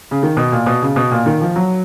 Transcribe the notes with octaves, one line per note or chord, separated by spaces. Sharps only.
C#3
D#3
B2
A#2
B2
C#3
B2
A#2
D#3
F3
F#3